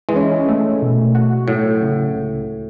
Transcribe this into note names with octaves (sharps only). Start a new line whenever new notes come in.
E3 G#3
C#4
A3
B2
F#4
A2 F#3
C#3
C#2